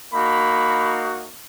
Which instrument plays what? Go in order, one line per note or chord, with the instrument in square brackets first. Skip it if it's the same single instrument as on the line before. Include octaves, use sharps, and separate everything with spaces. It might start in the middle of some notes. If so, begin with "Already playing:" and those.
[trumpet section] A#3 D#4 F#4 B5